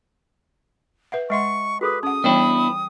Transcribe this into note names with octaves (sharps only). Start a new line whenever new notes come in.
B4 E5 F#5
G#3 D#5 E5 F#5 C6 C#6
F#4 G#4 A4 B4
C#4 F#5 D#6
E3 G3 B3 D4 E4 C#5 G5